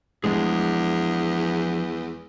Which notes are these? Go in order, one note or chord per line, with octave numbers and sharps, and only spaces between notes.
E2 F3 G#3 D4 G#4